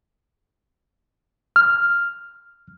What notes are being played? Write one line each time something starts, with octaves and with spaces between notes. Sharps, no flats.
F6